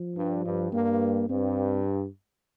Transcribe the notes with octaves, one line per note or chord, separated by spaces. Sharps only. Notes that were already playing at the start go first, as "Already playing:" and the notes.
Already playing: F3
G2
G2
G2 A#3
G2 C4